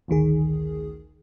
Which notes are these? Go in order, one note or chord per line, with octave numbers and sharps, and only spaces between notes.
A1 D2 D#3 G#4